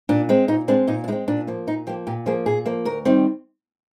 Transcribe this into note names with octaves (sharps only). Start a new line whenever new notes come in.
A#2 D4
G#3 C4
A#2 D#4
G#3 C4 D4
A#2 D#4
D4
G#3 C4 D#4
A#2 D4
F3 A#3
A#2 D#4
F3 A#3 G4
A#2 G4
F3 A#3 G#4
A#2 G#4
F3 A#3
D2 A#4
D#3 G3 C4